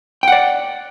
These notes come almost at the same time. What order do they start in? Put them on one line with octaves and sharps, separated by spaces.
G5 F#5 D5